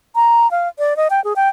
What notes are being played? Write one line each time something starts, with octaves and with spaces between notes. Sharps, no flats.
A#5
F5
D5
D#5
G5
G#4
G5